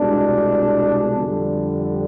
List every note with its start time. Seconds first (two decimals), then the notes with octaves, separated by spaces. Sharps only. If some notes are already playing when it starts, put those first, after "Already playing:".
Already playing: C2 B2 G#3 D4
1.16 F2 D3 G3